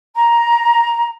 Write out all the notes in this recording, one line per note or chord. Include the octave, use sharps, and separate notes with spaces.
A#5